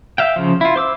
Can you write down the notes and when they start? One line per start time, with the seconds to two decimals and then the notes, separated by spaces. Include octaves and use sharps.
0.18 E5 F5 G5
0.36 C#3 F3
0.61 E4 F4
0.76 C5 D6 E6